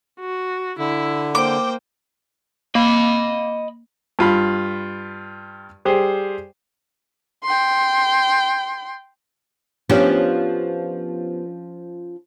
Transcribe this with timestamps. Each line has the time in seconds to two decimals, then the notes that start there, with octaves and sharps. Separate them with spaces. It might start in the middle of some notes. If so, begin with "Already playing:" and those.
0.20 F#4
0.79 D3 E4
1.35 A#3 C5 G5 D6
2.75 A#3 D#5 B5
4.19 G2 F4 B5
5.85 G3 G4 G#4 C5
7.44 G5 C6
9.90 F3 B3 C#4 D4 G4